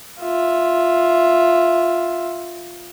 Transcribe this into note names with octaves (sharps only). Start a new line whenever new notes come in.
F4 E5